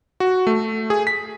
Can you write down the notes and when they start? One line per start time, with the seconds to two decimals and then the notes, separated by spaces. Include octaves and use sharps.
0.20 F#4
0.47 A3
0.90 G#4
1.07 B6